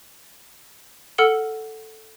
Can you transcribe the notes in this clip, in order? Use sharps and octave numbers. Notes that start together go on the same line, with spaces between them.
A4 F#5 E6 F6 C#7 G7